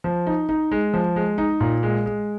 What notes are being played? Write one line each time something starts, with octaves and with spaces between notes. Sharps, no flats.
F3
D#4
D#4
G#3
F3
G#3
D#4
A#2
G#3
G#3